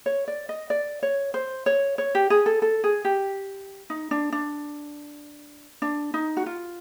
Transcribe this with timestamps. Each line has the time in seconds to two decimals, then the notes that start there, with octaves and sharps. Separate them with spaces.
0.06 C#5
0.28 D5
0.49 D#5
0.70 D5
1.03 C#5
1.34 C5
1.66 C#5
1.98 C#5
2.15 G4
2.30 G#4
2.46 A4
2.62 A4
2.84 G#4
3.05 G4
3.90 D#4
4.11 D4
4.32 D4
5.82 D4
6.14 D#4
6.37 F#4
6.46 F4